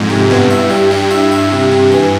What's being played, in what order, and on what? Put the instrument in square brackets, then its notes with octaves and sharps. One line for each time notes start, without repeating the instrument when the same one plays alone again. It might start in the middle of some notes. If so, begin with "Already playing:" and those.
Already playing: [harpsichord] F2 [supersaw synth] G#2
[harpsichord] C3
[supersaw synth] G2 [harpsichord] B2
[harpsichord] E4
G3
[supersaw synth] G2 [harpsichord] G3
[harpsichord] E4
E4
C3
C3
E3